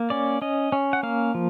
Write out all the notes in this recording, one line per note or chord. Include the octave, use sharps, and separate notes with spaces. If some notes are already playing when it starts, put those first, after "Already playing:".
Already playing: A#3
C#4 D5
C#4 D#5
C#4
F#5
A#3 F5
F3